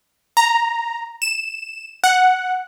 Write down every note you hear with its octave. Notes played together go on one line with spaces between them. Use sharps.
A#5
E7
F#5